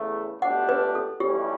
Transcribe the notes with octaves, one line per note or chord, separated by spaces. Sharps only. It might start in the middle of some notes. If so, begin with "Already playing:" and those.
Already playing: E2 C#3 E3 A3
C#2 B2 A3 D4 G4 F#5
B4
A4
B1 A2 E3 G3 C#4 G4